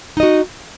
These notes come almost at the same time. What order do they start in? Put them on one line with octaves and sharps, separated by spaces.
D#4 D#5 F#4